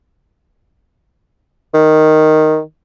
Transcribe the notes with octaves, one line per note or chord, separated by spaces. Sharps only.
D#3